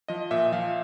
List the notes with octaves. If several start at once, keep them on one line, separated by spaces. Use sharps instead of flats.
F3 D#5
A#2 E5
F3 F5